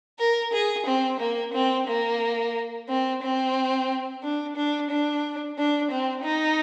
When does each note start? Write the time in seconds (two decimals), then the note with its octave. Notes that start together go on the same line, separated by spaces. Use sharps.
0.19 A#4
0.53 G#4
0.86 C4
1.19 A#3
1.53 C4
1.87 A#3
2.89 C4
3.22 C4
4.22 D4
4.56 D4
4.90 D4
5.58 D4
5.91 C4
6.24 D#4